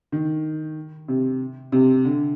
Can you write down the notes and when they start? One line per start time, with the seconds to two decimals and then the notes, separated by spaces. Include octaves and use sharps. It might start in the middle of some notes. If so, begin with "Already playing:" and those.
0.12 D#3
1.08 C3
1.72 C3
2.05 D3